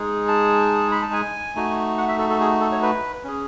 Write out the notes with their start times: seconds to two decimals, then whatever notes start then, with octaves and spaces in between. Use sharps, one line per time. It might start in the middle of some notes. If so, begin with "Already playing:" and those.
Already playing: G#3 D#4 G#4
0.28 A5
0.92 B5
1.02 A5
1.13 G#5
1.55 A3 D#4 F#4
1.98 F#5
2.08 E5
2.18 A4
2.30 A4
2.40 G#4
2.61 A4
2.72 C#5
2.82 B4
3.24 C#4 G#4